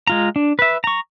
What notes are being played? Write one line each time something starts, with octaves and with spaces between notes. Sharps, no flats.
G#3 F4 A#5
D4
B4 E5
A#5 C#6